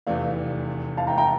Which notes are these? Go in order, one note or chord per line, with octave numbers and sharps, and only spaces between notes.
F1 E2 C3 E3 A3 D5 F5
F5 A5
G5 A#5
G5 A#5